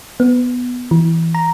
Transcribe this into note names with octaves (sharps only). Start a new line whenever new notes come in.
B3
E3
A#5